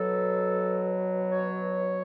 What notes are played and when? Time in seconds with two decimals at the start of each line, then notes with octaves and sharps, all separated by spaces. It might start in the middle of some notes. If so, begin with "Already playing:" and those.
Already playing: B2 F#3 A4
1.32 C#5